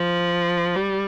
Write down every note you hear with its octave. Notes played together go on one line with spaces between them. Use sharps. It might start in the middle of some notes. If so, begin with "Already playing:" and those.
Already playing: F3
G3